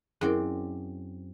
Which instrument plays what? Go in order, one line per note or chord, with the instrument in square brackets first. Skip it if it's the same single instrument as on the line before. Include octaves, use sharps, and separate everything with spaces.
[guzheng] F#2 C4 D5 [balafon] E4 G#4